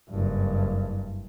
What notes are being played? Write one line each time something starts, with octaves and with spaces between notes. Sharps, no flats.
F#1 G2